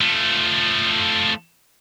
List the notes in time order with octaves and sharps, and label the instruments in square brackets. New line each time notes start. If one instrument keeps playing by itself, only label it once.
[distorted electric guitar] F3 A3